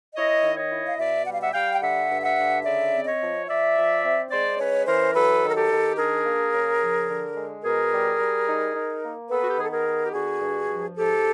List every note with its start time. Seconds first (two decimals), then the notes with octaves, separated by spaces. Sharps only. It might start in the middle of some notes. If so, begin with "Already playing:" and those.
0.16 E4 C#5 D#5
0.43 D#3
0.57 C#5 D#5
0.71 E4
0.87 F5
0.98 B2 D5 E5
1.26 G3 F#5
1.34 F5
1.42 E5 F#5
1.53 G3 F5 G5
1.74 G5
1.82 D3 E5 F#5
2.09 G2
2.23 E5 F#5
2.37 D3
2.65 C#3 D5 E5
2.93 C4
3.06 C#5 D#5
3.20 F3
3.48 F3 D5 E5
3.76 F3
4.04 C4
4.31 G#3 C5 D5
4.59 C#4 B4 C#5
4.87 E3 A#4 C5
5.14 F#3 A4 B4
5.43 D#3
5.50 A#4
5.55 G4 A4
5.70 D#3
5.97 D4 G#4 A#4
6.25 A#3
6.52 C#3
6.81 F3
7.08 D3
7.36 G#3
7.64 B2 G#4 A#4
7.91 G3
8.19 G3
8.47 D#4
8.75 D#4
9.02 A#3
9.30 B3 A4 B4
9.43 F#4
9.50 G4
9.58 D#3 G#4
9.65 A4
9.71 G#4 A#4
9.86 B3
10.04 G4
10.13 D3 F#4 G#4
10.41 G2
10.69 F3
10.97 G#2 G4 A4